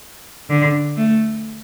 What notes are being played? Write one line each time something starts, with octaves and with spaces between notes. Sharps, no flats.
D3
A3